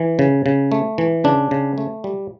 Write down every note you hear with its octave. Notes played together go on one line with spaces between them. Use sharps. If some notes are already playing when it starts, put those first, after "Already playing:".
Already playing: E3
C#3
C#3
A3
E3
C#3 D4
C#3
A3
G3